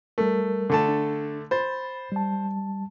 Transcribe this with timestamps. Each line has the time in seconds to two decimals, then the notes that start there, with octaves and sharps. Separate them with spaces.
0.18 G3 A3 A#4
0.70 D3 A3 A5
0.88 D4
1.51 C5 B5 A6
2.12 G3 A5